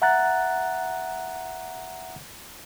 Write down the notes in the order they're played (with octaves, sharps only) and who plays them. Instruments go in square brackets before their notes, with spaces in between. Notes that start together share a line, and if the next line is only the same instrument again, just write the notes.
[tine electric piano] E5 F#5 A#5 F#6 A6